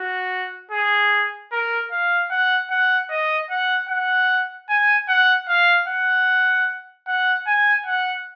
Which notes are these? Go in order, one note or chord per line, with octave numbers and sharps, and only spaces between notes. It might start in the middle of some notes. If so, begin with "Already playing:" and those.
Already playing: F#4
G#4
A#4
F5
F#5
F#5
D#5
F#5
F#5
G#5
F#5
F5
F#5
F#5
G#5
F#5